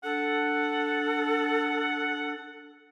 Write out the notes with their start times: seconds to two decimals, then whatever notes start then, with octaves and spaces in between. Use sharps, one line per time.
0.04 D4 A4 F#5